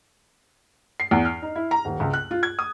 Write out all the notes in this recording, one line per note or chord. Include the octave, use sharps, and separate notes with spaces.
C7
E2
F6
D#4
E4
A#5
D#1
C#2
F#6
F4
G#6
D#6